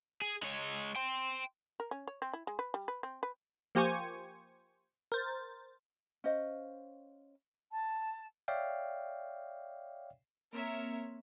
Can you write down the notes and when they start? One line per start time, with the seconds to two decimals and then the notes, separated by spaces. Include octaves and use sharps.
0.22 G#4
0.43 G#3 C#5
0.96 G5 C6
1.80 A#4
1.91 C#4
2.07 C#5
2.22 C4
2.33 E4
2.47 G#3
2.59 B4
2.74 G3
2.88 B4
3.03 C4
3.23 B4
3.75 F3 A#3 G4 C5 G#5 C#6
5.12 A#4 C5 A6
6.24 C#4 C5 D#5 F5
7.71 A5
8.48 C#5 D5 E5 F5 G5
10.53 A#3 C4 A#4 C#5 E5